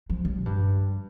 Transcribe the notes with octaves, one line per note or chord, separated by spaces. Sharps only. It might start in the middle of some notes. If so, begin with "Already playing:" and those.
F3
G3
A#2
G2